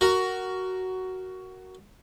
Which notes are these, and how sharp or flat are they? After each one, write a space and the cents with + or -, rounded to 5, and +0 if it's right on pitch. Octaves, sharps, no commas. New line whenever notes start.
F#4 +10 A#4 +0